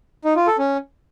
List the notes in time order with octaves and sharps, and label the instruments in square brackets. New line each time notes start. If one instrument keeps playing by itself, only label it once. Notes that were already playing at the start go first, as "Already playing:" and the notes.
[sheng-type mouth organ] D#4
F4
A4
C#4